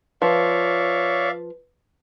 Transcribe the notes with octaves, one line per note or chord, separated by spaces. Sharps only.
F3 B4 C#5 D5 E5 F5